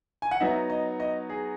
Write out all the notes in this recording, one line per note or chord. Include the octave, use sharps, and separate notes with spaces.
G#5
F#5
F#3 B3 D#4 E5
D#5
D#5
G#4